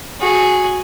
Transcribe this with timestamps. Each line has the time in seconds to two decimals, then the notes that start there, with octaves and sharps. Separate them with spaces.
0.20 F#4 G#4